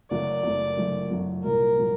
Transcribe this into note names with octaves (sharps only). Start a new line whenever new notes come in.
F#1 F#2 F#3 A3 D5
F#1 F#2 F#3 A3
F#1 F#2 F#3 A3
F#1 F#2 F#3 A3
C2 A#2 F#3 A#4
A#2 F#3